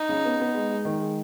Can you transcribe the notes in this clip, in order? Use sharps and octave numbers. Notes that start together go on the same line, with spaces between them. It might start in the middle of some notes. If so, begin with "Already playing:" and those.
Already playing: D#4
C#3
B3
B3
G#3
G#3
D#3
G#3